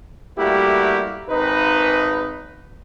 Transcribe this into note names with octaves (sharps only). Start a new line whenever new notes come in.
G3 A3 A#3 E4 F#4 G4
G#1 D#4 B4